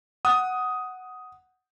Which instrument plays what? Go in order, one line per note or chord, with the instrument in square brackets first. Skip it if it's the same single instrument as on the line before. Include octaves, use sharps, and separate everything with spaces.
[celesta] F#5 F#6 [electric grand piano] D#6